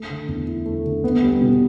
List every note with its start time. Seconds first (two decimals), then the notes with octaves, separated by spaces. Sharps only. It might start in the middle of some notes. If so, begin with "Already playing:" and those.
Already playing: A3
0.10 D3
0.28 E2
0.47 E4
0.66 A3
0.85 D3
1.04 B3
1.23 G3
1.41 B2